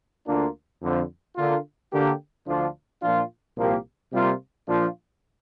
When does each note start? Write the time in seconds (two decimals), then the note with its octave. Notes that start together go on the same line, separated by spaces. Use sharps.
0.27 D2 D3 A#3 D4 F4
0.82 F2 D3 F3
1.36 D3 A#3 F4
1.92 D3 A#3 G4
2.46 D2 D3 F3 D4 F4
3.02 A#2 F3 D4 F4
3.56 C2 A#2 F3 A#3 G4
4.12 C3 G3 A#3 F4
4.66 A#2 F3 D4 F4